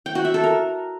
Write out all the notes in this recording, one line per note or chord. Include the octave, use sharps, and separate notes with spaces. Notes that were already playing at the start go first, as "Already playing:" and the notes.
G5
F#4
E5
A4
A#4